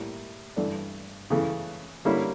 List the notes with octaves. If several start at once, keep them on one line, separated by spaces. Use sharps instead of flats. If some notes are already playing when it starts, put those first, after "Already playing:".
Already playing: A2 G3 A#3
G2 E3 A3 D4
C#3 E3 A3
D3 G3 A#3 C#4 E4